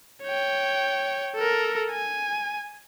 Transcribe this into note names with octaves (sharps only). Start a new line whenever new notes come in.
C#5 G5
A4 A#4
G#5